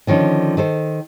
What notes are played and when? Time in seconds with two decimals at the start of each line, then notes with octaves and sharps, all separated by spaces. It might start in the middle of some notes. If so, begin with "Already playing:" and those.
0.07 D3 D#3 F3 C#4
0.57 D#3 A4 C5